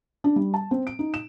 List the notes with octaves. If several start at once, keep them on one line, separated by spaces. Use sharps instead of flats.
D4
G3
A5
C4
D7
D#4
E7